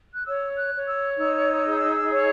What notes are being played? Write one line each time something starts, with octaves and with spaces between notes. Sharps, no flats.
F#6
C#5 E6
F#6
C#5
E6
D#4 E6
G#4
C#5